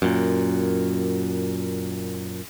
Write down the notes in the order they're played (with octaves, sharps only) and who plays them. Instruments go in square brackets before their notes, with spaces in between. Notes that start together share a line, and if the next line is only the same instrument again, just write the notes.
[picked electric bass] F#2 A#2